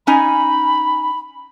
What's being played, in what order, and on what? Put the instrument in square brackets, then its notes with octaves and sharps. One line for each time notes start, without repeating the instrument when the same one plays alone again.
[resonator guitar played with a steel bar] C#4 D#4 G#5 [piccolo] B5